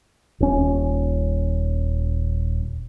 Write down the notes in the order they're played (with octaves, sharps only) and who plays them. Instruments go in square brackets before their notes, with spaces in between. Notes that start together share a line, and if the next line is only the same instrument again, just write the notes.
[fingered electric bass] D#1 C#4